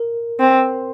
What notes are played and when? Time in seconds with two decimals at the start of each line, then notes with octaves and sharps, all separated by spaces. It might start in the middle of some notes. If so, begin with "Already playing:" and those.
Already playing: A#4
0.40 C4